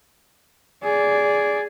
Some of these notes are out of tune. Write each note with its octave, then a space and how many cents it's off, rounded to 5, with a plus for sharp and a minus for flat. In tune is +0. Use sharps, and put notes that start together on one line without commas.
G#4 +0 D5 -15